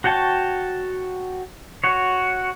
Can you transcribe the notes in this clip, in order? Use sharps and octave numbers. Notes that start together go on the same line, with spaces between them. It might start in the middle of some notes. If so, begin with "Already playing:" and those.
F#4 C#5 G5 A5
F#4 C#5